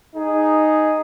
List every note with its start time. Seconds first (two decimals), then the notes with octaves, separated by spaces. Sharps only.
0.16 D#4 G#4